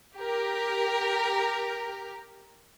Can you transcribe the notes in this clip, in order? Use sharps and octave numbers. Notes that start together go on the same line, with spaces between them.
G4 A#4